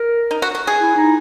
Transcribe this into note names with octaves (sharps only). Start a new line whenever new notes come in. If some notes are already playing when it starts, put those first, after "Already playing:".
Already playing: A#4
D#4
F#4
F#4
G#4
E4
D#4